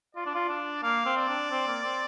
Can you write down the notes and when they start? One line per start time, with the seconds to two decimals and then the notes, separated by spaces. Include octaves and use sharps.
0.15 F4 D5
0.26 D4
0.35 F4
0.49 D4
0.83 A#3 F5
1.06 C4
1.17 D5
1.28 D4
1.51 C4
1.68 A#3
1.84 C4